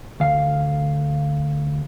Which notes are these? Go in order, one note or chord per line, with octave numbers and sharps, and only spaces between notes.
D2 F5